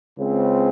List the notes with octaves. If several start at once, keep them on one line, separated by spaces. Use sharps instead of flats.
C#2 C#3 G#3 C4